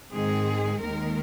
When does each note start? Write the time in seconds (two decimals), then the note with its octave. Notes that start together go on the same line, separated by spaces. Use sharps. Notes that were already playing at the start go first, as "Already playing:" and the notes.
0.11 G#2 D#3 G#3 C4 G#4
0.81 D#2 D#3 G#3 A#4